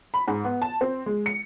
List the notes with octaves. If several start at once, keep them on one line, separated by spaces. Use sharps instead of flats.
B5
G#2
B3
A5
C4
G#3
C#7